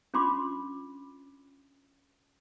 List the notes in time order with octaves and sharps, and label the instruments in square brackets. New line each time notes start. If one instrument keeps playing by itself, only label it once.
[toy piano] C#4 D4 F4 B5 C6 D6